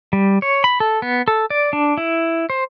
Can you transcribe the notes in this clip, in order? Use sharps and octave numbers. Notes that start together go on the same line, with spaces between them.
G3
C#5
B5
A4
B3
A4
D5
D4
E4
C5